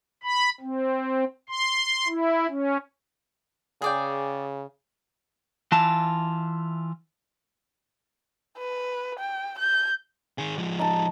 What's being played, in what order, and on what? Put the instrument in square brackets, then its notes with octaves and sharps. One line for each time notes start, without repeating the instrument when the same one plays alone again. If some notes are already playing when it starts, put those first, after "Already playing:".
[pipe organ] B5
C4
C6
E4
C#4
[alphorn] C#3 [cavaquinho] G#4 D5 G5
[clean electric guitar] E3 E4 F4 A5
[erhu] B4
G5
G6
[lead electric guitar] D#3 G#4
F3 G#3
[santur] D#4 A5